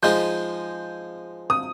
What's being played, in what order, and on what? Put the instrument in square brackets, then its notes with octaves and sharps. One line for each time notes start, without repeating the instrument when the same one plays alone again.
[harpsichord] F3 G#3 D#4 [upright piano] G6
[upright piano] D#6